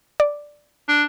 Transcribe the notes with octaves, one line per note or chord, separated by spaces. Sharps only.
D5
D4